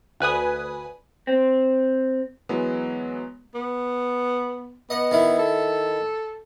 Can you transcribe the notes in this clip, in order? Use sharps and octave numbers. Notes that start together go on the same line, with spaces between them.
D2 B4 G#5 D#6
C4
E3 F#3 G#3 B3
B3
B3 D#5
D#3 E4
A4